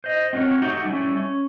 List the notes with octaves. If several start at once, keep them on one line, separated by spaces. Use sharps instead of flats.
C5 D#5
C4 F4 F#4 A#4 C#5
A3 D#4 F#4 G4
G3 A3 C#4 E4
C#4